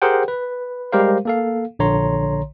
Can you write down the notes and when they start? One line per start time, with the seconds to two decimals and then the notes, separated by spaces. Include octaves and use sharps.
0.02 G4 G#4 A#4 C5 F#5 G5
0.28 B4
0.92 G3 G#3 G4 A#4 C5 F5
1.25 A#3 A4 F5
1.79 A#1 D3 C#5 A#5 C6